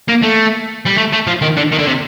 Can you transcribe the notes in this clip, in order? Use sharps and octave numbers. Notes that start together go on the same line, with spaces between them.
A#3
A3
G3
A3
A3
F3
D#3
D3
D#3
D3
C3